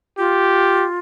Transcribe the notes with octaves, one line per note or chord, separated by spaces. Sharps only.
F4 G4